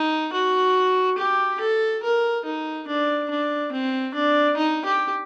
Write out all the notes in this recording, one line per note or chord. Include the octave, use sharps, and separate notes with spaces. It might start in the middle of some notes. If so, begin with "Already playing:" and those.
Already playing: D#4
F#4
G4
A4
A#4
D#4
D4
D4
C4
D4
D#4
G4